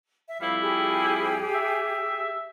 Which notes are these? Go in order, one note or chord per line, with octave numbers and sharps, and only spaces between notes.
E5
F2 G3 E4 F5
G4 G#4
E5